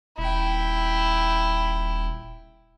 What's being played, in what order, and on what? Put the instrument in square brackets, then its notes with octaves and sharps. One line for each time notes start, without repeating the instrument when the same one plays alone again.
[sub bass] D#1 [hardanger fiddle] E4 G5